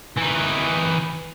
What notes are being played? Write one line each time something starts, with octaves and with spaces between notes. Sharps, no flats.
E3 D#4